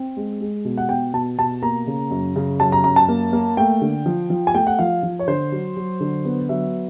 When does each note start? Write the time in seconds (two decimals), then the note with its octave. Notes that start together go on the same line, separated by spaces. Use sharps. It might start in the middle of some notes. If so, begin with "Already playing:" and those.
Already playing: C4
0.17 G#3
0.41 G#3
0.65 B2
0.78 F#5
0.89 B2 G5
1.14 B2 A5
1.38 B2 A5
1.62 A#3 A#5
1.87 C#3
2.11 F#2
2.36 C#3
2.60 F#2 A5
2.72 A#5
2.84 F#2 A#5
2.96 A5
3.09 A#3
3.33 A#3
3.57 A3 G5
3.81 D3
4.06 F3
4.30 F3
4.47 G#5
4.54 A3 G5
4.67 F#5
4.79 F3 F5
5.03 F3
5.19 C#5
5.28 D3 C5
5.52 F#3
5.77 F#3
6.00 D3
6.25 B3
6.49 F#3 E5